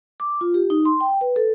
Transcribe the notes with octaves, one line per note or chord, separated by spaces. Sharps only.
D6
F4
G4
D#4
C6
G5
B4
A4